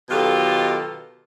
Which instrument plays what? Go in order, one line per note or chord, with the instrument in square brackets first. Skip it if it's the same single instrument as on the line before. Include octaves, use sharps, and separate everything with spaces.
[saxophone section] B2 D#3 F#3 F4 G4 A4